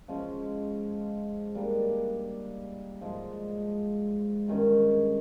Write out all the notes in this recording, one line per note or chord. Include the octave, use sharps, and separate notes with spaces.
F3 G#3 C#4
G3 A#3 D4
G#2 F3 G#3
G2 D#3 G#3 C#4